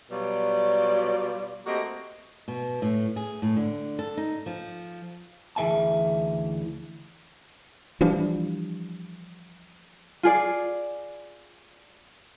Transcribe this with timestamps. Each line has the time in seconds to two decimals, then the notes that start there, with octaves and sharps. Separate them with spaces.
0.11 B2 F#3 G3 F4 D5
1.66 A3 A#3 C4 F#4 G4 D#5
2.48 B2
2.82 A2
3.16 G#4
3.42 A2
3.56 D3
3.99 A4
4.17 D#4
4.46 F3
5.56 D2 E3 G#4 E5 G#5 A5
8.01 E3 F3 G3 D4
10.23 F4 G#4 D5